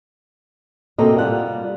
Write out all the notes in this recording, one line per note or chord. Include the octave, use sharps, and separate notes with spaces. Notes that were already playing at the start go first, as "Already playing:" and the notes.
C3 A#3 C4 F#4 A4 D#5
G3 F4 F#5